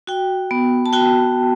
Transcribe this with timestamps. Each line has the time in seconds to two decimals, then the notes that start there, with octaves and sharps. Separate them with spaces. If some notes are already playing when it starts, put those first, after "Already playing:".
0.07 F#4 G5
0.51 B3
0.86 A5
0.93 F#4 G5